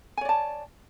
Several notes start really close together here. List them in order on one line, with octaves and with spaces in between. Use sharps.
G#5 C#5 D5 A5